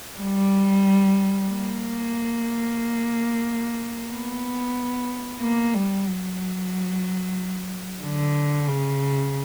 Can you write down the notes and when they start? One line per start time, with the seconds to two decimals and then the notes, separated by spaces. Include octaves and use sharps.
0.19 G3
1.49 A#3
4.11 B3
5.40 A#3
5.74 G3
6.07 F#3
8.03 D3
8.67 C#3